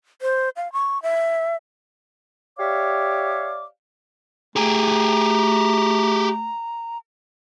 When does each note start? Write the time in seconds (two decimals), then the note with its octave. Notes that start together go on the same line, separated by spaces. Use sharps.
0.22 C5
0.56 F5
0.73 C#6
1.03 E5
2.58 G4 C#5 D5 E5 F5 D6
4.56 A3 G4 G#4 A#5